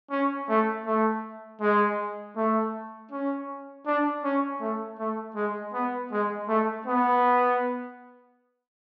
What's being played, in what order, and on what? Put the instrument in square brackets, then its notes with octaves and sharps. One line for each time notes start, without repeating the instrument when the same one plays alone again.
[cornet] C#4
A3
A3
G#3
A3
C#4
D4
C#4
A3
A3
G#3
B3
G#3
A3
B3